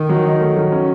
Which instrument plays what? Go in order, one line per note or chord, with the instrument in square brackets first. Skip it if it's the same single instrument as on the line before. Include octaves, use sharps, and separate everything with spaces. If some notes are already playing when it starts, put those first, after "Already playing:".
Already playing: [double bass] D#3
[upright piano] F#3
D#4
A3
F#3
C#4